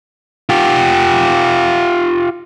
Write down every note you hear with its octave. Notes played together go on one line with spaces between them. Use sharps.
F4 G4